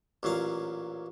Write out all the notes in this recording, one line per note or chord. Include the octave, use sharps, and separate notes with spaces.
A1 A#2 F#3 F5